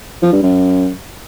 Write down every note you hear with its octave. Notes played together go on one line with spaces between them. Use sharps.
F3
G2
F#2